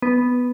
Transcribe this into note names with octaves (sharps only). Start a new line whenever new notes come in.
B3